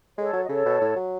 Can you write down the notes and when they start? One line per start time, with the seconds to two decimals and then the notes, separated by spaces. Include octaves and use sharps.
0.17 G#3 A4 C#5
0.33 F#3
0.43 D#5
0.49 C#3 A4 C#5
0.66 B2
0.81 A2
0.96 F#3